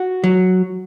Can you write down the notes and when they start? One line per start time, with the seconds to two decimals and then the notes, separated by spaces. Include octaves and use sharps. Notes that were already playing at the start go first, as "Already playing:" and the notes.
Already playing: F#4
0.24 F#3